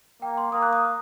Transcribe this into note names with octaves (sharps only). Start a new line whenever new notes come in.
A#3 G5
C6
A#3 D#6
F#6
D#6